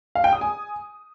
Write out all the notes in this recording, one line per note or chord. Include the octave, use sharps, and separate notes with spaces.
F5
G5
D#6
G#5